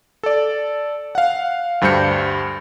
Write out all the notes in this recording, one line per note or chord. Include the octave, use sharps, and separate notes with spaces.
A4 D5
F5 F#5
D2 G2 G3 C5 G6 C#7